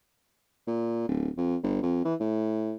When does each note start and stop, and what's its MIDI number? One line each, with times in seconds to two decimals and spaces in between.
0.68 1.06 46
1.08 1.29 26
1.37 1.56 41
1.63 1.80 31
1.83 2.03 41
2.05 2.15 52
2.20 2.77 45